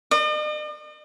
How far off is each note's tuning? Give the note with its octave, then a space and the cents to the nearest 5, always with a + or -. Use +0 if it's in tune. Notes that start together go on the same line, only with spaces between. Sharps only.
D#5 -45